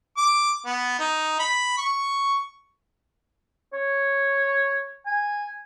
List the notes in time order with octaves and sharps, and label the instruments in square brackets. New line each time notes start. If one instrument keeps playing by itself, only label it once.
[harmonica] D6
B3
D#4
B5
C#6
[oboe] C#5
G#5